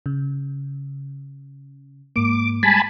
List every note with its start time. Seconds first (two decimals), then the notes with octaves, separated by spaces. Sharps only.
0.06 C#3
2.16 G#2 A#3 D6
2.63 G3 G#3 G#5 A5 B5